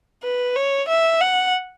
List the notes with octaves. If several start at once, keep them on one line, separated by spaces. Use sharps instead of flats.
B4
C#5
E5
F#5